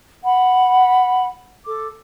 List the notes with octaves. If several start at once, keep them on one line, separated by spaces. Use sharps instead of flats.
F#5 B5
A4 D6